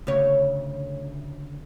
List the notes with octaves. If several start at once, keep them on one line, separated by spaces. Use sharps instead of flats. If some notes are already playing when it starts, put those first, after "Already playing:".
D2 C#3 C#5